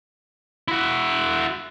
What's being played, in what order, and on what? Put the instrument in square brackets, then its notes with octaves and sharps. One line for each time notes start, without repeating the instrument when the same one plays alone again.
[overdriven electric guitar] E4 F#4